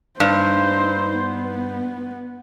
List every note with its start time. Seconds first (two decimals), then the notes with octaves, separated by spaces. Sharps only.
0.20 G2 D#4 C5
1.17 B3